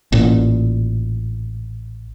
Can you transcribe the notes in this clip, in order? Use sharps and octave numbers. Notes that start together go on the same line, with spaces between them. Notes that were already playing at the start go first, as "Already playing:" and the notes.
A1 A#2